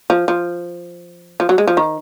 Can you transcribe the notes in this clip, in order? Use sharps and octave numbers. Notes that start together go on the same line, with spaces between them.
F3
F3
F3
F#3
G#3
F3
D#3